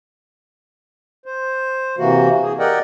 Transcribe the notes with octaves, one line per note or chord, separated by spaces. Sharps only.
C5
C3 E3 A#3 F#4
G#4
A#4 D5 D#5 F#5 G5